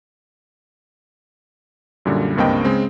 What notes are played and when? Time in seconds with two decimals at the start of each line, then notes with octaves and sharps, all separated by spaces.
2.05 F#2 A#2 D3 G3
2.37 C#2 G2 A#3 C4 D#5 G5
2.64 C#3 G#3 C4